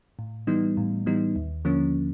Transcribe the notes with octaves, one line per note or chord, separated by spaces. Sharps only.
A2
E3 G3 B3 D#4
A2
E3 G3 B3 D#4
D#2
D3 F3 A#3 C#4